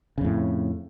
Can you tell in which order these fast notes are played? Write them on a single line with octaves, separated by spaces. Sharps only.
C#3 F2 A2